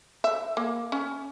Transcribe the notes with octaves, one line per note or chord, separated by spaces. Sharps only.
E5
A#3
C#4